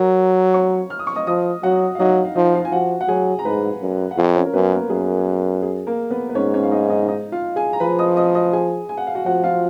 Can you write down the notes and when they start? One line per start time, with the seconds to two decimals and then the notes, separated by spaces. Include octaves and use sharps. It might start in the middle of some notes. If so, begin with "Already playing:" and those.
Already playing: F#3 A#4 A#5
0.54 C#5 C#6
0.90 F6
0.99 D#6
1.07 C#6
1.16 D#5 D#6
1.27 F3 D#5 D#6
1.63 F#3 F#4 F#5
1.95 F5
1.99 F#3 D#4 D#5
2.25 F5
2.35 F3 D#4 D#5
2.54 F4 F5
2.65 G#5
2.72 F3 F#4 F#5
3.01 F#5
3.08 F#3 G#4 G#5
3.39 A#5
3.45 G#2 B4 B5
3.81 F#2
4.11 F#5
4.17 F2 F4 F5
4.35 C#4 C#5
4.46 A#4
4.53 F#2 B3 B4
4.72 A#3 A#4
4.89 F#2 G#4
5.63 G#4
5.87 A#3 A#4
6.10 B3 B4
6.29 B4
6.35 G#2 C#4 C#5
6.54 C#4 C#5
6.63 F5
6.71 D#4 D#5
6.90 D#4 D#5
7.08 D#4 D#5
7.32 F4 F5
7.56 G#4 G#5
7.73 A#5
7.80 F3 B4 B5
7.99 D#5 D#6
8.17 D#5 D#6
8.34 D#5 D#6
8.53 G#4 G#5
8.89 G#5
8.97 F#5
9.07 F5
9.15 F#4 F#5
9.25 F3 F#4 F#5
9.44 F4 F5